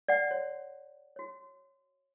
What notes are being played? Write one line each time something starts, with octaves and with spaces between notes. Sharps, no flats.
D5 F#5
F#4 C#5
F#4 C#5